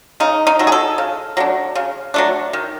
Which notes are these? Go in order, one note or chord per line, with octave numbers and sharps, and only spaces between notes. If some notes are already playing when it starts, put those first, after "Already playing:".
C#3 D#4
D#4
F#3 A3 D4
G#4
A4
C#3
F#3 A3 D4
C#3
F#3 A3 D4
D#3